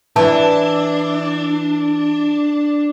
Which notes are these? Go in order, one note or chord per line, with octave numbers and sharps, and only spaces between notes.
E3 D4 A5